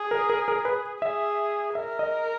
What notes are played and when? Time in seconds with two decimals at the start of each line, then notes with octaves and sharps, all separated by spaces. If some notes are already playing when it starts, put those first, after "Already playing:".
Already playing: G#4
0.11 A#4
0.30 A#4
0.48 A#4
0.65 B4
1.02 G#4 E5
1.75 A#4 E5
1.99 D#5